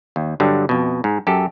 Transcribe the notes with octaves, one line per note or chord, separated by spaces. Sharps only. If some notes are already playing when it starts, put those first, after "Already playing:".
D#2
G2 D3 F#3 G3
F2 B2
G#2
F#2 G4 A4